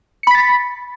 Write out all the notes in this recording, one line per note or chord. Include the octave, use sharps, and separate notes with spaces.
B5 A6 B6 C#7